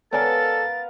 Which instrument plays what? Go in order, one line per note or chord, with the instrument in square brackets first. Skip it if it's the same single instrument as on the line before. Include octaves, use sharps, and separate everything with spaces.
[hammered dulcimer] B3 A#4 F5 [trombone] A4 [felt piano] C#5 D5 G#5 [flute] A6